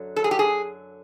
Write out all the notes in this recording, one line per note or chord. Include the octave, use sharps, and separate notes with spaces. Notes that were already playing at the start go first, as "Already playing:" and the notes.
Already playing: F#2 D3 F#3
A4
G#4
G4
G#4